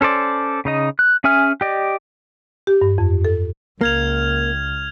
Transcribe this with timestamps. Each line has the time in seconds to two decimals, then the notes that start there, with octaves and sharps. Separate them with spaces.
0.01 C#4 A4 C5 D5
0.65 C#3 D#4 D#5
0.99 F#6
1.24 C#4 G#4 E5 G#5 F6
1.61 G4 D5 D#5
2.67 G4
2.81 G2
2.98 F2
3.25 A4
3.81 C#2 A#3 F6 G#6 F7